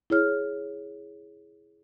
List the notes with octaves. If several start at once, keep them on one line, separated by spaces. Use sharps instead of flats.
E4 G#4 C#5 F6